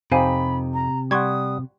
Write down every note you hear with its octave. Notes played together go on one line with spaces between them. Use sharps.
F2 C3 D#4 G4 C5 F5 G#5 B5
A#5
G3 F#5 C6 C#6 D#6 G#6